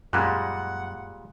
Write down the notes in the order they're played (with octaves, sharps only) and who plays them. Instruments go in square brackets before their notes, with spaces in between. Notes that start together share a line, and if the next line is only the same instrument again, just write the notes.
[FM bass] F#2 [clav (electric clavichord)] A#2 G3 G#3 [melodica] F#5 [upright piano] F#6